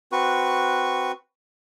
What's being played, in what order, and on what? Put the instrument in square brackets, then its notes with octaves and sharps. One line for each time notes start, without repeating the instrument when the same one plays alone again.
[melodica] C4 F#4 B4 C#6